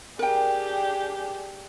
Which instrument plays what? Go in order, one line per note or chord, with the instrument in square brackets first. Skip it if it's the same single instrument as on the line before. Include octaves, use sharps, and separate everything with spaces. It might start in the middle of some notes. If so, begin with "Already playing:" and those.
[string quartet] D4 G4 G#4 [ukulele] A#4 G5